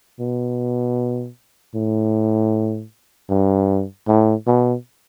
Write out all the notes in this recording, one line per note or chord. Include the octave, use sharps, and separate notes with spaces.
B2
A2
G2
A2
B2